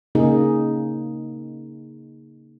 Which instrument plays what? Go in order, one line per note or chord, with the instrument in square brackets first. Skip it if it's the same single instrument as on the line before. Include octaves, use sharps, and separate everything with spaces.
[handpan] C#3 A#3 D#4 G#4